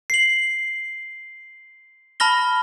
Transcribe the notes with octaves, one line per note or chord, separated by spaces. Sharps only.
C7 F#7
A5 B5 F6 A#6 G7